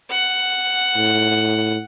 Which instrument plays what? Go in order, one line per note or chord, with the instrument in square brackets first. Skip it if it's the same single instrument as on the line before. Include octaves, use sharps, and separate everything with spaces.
[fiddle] F#5
[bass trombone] A2